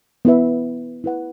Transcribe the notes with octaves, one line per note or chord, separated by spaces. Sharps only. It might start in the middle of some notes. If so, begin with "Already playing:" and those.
B3 E4 B4 E5
E4 B4 F#5